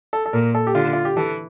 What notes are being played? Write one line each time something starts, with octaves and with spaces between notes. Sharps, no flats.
A4
A4
A#2 A#4
A4
G4
D3 F4
F4
G4
E3 A4